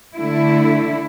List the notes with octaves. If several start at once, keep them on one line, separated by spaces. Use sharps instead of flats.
D3 A3 E4